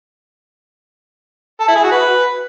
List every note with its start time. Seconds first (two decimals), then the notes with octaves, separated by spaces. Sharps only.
1.60 A4
1.68 E4
1.76 G#4
1.84 F#4
1.92 B4